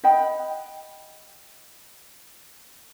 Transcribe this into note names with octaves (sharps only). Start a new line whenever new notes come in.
D#5 F#5 G5 B5